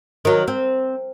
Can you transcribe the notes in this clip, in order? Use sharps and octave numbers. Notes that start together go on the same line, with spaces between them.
D#3 F#3
C4